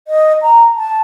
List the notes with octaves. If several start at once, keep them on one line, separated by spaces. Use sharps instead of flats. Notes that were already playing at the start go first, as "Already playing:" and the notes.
D#5
A#5
A5